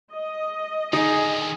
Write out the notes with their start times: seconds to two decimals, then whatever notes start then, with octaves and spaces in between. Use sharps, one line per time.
0.12 D#5
0.93 D3 D#3 D#4 G#4